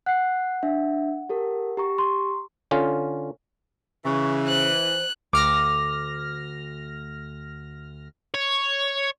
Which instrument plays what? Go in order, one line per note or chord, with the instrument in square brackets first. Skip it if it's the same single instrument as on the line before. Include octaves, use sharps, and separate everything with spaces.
[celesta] F#5 [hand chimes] F#6 C7
[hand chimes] D4 E5
G4 A4 A#4
G4 A#5 C#6
[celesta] C6
[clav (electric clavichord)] D3 C#4 F4
[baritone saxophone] C#3 [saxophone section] E3 [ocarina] C#6
[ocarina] C5 [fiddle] F#6
[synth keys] D2 F6 A#6 [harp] D6
[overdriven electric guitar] C#5